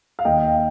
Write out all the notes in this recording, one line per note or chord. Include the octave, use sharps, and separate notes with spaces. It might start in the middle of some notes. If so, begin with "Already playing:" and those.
F5
D#2 D#5 G5